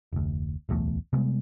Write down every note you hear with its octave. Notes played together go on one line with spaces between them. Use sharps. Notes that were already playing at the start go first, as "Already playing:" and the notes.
F1 D2
D1 B1 E2 A3
C3 G3 G#3 B3